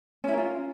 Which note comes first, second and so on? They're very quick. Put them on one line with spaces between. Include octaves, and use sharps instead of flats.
C#4 E4 A#4 F4